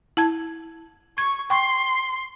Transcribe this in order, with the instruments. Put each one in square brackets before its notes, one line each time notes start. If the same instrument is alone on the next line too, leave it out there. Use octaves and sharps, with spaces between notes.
[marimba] E4 A5 G#6
[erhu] C#6 [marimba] G#6
[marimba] G5 C#6 [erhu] C6